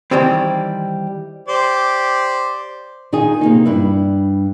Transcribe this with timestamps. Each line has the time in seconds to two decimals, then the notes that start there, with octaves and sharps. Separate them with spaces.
0.11 D#3 E3 G3 C4
1.49 G4 C5 D5
3.13 D#3 D#4 F4 G#4
3.41 C3 A#3 D#4
3.66 G2 E4